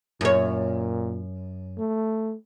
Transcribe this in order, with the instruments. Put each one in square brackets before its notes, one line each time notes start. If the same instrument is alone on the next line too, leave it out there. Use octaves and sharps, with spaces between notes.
[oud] F#2 C#5 [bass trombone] A#2
[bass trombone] A3